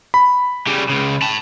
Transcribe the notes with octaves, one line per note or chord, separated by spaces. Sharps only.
B5
C#3 G3
C#2 C#3
A5 B5